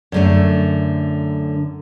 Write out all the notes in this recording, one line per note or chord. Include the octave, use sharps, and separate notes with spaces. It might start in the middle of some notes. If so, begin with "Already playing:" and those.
F#2 D3 A3